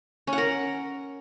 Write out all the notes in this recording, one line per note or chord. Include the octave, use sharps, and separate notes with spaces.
C#4
F#5
A#4